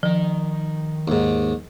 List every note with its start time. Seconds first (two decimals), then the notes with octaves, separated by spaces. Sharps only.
0.03 D#3 F3 D#5
1.08 D#2 G#2